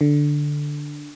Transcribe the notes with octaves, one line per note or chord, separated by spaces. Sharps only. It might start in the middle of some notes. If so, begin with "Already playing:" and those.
D3